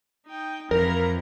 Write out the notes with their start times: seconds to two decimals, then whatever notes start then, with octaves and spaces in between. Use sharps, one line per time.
0.26 D#4 G5
0.71 F2 E3 A#4 A#5